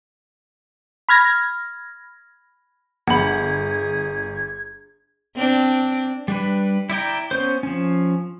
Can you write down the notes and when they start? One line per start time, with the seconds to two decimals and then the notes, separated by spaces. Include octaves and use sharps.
1.09 B5 F6 G#6 A#6
3.08 G1 G#4 F#5 B5 G#6
5.36 C4 D4
6.28 G3 D4 B4
6.90 E4 D5 G5 A#5
7.31 B3 C#4 C5
7.63 F3 C#4